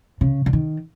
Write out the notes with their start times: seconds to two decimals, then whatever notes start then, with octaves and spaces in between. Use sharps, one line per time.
0.21 C#3
0.46 D3
0.53 D#3